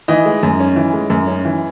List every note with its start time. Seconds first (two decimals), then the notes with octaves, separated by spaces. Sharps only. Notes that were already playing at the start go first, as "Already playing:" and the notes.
0.08 E3 D#5
0.25 G#3
0.43 F#2
0.60 C#4
0.76 E3
0.93 G#3
1.10 F#2
1.27 C#4
1.45 E3